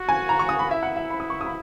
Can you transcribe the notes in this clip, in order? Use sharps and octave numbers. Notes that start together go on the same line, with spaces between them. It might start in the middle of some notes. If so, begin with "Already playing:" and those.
Already playing: F#4
G#5
A#5
C#6
D#6
B5
E4 E5
F#5
E5
B5
D#6
C#6
D#6
B5